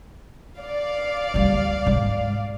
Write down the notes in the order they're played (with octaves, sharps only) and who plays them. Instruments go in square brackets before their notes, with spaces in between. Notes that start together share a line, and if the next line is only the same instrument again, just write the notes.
[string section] D5 F5
[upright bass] D2 G3
G#2 G#3